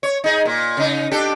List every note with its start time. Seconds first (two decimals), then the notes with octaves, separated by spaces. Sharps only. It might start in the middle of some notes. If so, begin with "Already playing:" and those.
0.03 C#5
0.24 D#4 G#4
0.45 A#2
0.77 C#3 D#4
1.11 D4 G4 A4